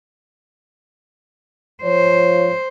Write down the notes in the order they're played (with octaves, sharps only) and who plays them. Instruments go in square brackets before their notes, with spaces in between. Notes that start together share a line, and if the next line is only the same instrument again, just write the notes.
[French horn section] F3 C#5 [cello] C5